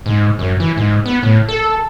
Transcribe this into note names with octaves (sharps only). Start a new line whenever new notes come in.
G#2
F#2
E3
G#2
B3
A2
A4